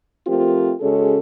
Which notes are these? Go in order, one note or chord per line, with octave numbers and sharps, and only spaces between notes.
F3 A3 C4 F4 G4 A#4
C#3 G#3 C#4 F#4 G#4 A4